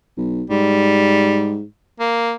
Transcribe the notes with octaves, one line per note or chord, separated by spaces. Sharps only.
B1
G#2 G3
A#3